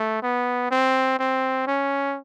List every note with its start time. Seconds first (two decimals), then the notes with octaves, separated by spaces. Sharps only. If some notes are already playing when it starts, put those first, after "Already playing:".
Already playing: A3
0.23 B3
0.71 C4
1.19 C4
1.67 C#4